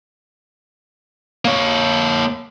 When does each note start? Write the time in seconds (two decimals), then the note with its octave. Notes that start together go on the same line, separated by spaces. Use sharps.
1.45 A#3 C#5